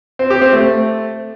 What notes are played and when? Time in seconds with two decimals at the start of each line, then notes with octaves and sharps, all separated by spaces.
0.19 C4
0.30 G4
0.42 C4
0.53 A3